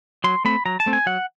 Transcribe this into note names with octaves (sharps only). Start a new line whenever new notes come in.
F#3 C6
A3 C4 B5
F#3 A#5
A5
A3 C4
G#5
F#3 F#5